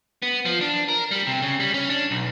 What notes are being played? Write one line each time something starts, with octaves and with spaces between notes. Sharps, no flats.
B3
F3
D4
A#4
G3
C3
C#3
G3
C#4
D4
B1